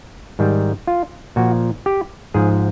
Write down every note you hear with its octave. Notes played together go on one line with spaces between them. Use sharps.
G#2 D#3 G3
F4
A#2 F3 F#4
G4
G#2 F3 G#4